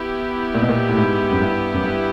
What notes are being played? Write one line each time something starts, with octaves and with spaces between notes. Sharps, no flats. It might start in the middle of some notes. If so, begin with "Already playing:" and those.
Already playing: B3 E4 G4
A#2
B2
A#2
A2
G#2
F#2
G2
F#2
G2